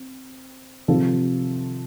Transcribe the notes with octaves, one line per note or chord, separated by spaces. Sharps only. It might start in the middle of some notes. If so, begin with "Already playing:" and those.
Already playing: C4
C3 F3 C4 F4 A4